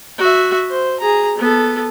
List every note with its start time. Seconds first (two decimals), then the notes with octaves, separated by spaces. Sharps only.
0.18 F#4 E5
0.70 C5
1.00 G#4 A#5
1.38 B3 A4